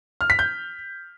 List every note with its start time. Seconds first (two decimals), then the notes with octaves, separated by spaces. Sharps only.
0.21 F6
0.30 B6
0.39 G6